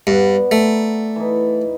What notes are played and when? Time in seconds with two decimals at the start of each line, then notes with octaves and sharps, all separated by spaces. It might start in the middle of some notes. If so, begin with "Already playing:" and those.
0.07 G2 B3 D5 F#5
0.51 A3 A#5
1.16 E3 D#4